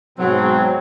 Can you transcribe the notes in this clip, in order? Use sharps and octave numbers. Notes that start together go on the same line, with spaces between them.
G#2 B2 F#3 C4